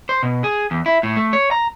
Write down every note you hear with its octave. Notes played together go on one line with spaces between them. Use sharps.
C5
B2
G#4
E2
E4
A2
A3
C#5
A#5